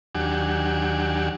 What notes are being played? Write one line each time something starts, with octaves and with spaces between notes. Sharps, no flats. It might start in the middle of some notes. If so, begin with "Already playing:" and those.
D#2 F#3 D4 G4 F#5 G#5